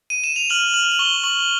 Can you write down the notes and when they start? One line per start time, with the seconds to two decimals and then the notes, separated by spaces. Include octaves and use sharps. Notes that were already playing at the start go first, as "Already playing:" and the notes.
0.10 D#7
0.24 E7
0.36 F7
0.50 F6 F#7
0.74 F6 F#7
0.92 F#7
0.99 C#6 G7
1.24 C#6 F#7